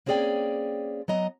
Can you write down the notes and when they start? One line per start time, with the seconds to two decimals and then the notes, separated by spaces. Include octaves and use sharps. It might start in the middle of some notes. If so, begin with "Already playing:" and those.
0.06 A#3 C4 C#4 G#4 D5 G5
1.08 F#3 B3 D#5 A#5